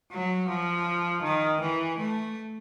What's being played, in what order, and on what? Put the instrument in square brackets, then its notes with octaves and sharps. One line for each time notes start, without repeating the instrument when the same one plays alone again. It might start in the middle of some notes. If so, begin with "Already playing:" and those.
[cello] F#3
F3
D#3
E3
A3